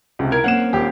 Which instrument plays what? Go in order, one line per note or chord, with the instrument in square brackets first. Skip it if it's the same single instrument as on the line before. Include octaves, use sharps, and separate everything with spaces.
[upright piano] C#2 C3
[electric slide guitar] E4 A#4 [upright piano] G#6
[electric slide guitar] A#3 C4 C#4 [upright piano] F#5 E7
[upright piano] D#1 G4